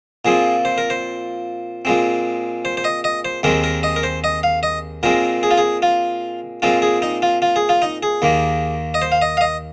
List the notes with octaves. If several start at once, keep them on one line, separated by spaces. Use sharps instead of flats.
A#2 F3 C4 G#4
C5
A#4
C5
A#2 G#3 C4
C5
C5
D#5
D#5
C5
D#2 D#3 G#3 C4 A#4
A#4
D#5
A#4
C5
D#5
F5
D#5
A#2 G#3 C4 A#4
G#4
F4
G#4
F4
A#2 G#3 C4 F4
G#4
D#4
F4
F4
G#4
F4
D#4
G#4
D#2 D#3 A#3
D#5
C5
F5
D#5
F5
D#5